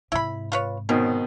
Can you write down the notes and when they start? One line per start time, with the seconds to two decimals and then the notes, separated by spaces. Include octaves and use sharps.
0.12 G#2 C3 E4 B5
0.52 F4 B4 C#5
0.89 B2 D#3 C4 C#4